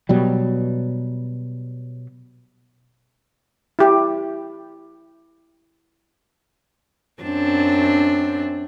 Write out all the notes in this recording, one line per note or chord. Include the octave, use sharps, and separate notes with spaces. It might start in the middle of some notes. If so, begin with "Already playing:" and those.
B2 F#3 G3
E4 G4
F#2 C4 D4